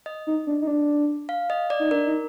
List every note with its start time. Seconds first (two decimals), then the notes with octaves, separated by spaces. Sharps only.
0.06 D#5
0.27 D#4
0.47 D4
0.62 D#4
0.67 D4
1.29 F5
1.50 D#5
1.70 D5
1.79 D#4
1.91 D4 A#4
2.07 D#4